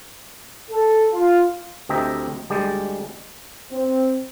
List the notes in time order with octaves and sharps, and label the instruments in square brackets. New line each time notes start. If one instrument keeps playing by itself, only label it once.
[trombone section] A4
F4
[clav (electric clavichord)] D2 C4 G4 D#5 E5 A#5
D2 G3 G#3 G4 D5
[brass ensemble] C4